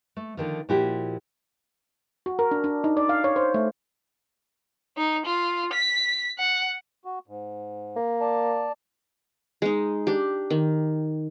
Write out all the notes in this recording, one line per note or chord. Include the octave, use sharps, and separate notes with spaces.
A3
D3 D#3 F3
A#2 F3 E4 F#4 G4
F#4
A#4
D4
D4
D#4
D5
F5
C#5
C5
A3
D#4
F4
B6
F#5
F#4
G#2
A#3
D5 A5
G#3 D#4
D4 G4
D#3